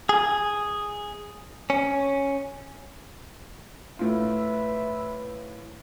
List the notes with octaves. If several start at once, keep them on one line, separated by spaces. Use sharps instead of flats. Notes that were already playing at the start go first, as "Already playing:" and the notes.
G#4
C#4
A2 F4 B4 E5